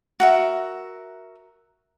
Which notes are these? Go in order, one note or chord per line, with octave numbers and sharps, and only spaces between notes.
F#4 A#4 E5